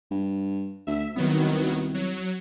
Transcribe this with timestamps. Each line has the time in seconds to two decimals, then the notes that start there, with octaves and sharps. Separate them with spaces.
0.11 G2
0.87 D2 E5
1.16 C2 D#3 F#3 B3
1.94 F#3